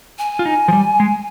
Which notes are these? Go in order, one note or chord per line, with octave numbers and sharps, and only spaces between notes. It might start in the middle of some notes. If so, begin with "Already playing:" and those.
G#5
F4
D#4
F3
G3
G#3